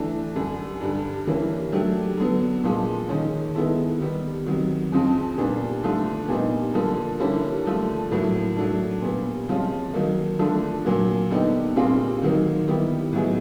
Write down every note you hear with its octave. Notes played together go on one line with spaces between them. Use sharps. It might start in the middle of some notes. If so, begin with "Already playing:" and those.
Already playing: E3 A3 D4
F#2 D3 G3
G2 D3 G3
E3 G3 A#3 C#4
F#3 A3 D4 G4
D3 F#3 B3
A#2 F3 G#3
D#3 G#3 C#4
D#3 G#3 B3 E4 A4
D#3 G3 B3
C3 D#3 F#3
F2 C#3 F3 G#3 C4
A#2 G3 B3 D4
D3 F3 A3 D4
A#2 G3 B3 D#4
D3 F3 A#3
D3 G3 A#3 C#4 E4
D3 F3 A3
A2 F#3 A#3
F#3 A3 D4
A#2 G3 B3
C3 F3 G#3 C#4 F4
D#3 F#3 A#3 D#4
D3 F3 A3 D4
A#2 F#3 A#3
D3 G3 B3 D#4 G4
A#2 G3 C4 F4 G#4
D#3 F#3 A#3 D#4
D#3 G3 B3 E4 G4
A2 F#3 B3 D#4 G#4